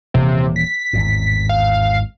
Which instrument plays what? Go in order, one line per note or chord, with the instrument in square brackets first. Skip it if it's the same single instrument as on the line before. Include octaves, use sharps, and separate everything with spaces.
[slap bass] D#1 E3 A#3 [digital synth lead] C3
[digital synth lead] B6
[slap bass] G#1 E2 A2
[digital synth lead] F5